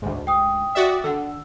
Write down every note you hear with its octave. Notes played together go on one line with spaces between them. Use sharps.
D2 G#2
G5 D#6
F#4 D5 E5
D3 F#5 E6